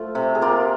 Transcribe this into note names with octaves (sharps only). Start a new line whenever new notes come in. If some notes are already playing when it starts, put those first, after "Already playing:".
Already playing: F3 A3 F4
C3
G#4
A#3 F4 G4